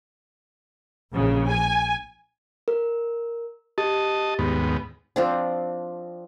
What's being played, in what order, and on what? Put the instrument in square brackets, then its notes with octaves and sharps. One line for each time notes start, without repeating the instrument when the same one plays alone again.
[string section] A#1 C#3
G#5
[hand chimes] A#4
[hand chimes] G4 [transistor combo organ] D#5 A5
[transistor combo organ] D#2 G#2 B3
[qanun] F3 C4 D4